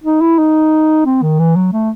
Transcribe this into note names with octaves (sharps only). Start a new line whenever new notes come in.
D#4
E4
D#4
C4
D#3
E3
F#3
A3